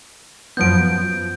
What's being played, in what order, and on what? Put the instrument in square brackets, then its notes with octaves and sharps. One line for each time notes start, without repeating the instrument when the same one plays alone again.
[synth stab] F#2 F3 B3 [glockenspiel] G6 D7